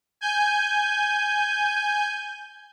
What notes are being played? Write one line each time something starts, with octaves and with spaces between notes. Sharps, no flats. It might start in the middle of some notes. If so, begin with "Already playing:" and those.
G#5 G6